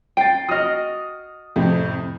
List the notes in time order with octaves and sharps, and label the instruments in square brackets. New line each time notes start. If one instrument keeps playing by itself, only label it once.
[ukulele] G5 [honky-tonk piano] A6 C7 D7
[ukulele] F#4 D#5 [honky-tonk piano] D#6 F6
[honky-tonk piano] F2 A2 C3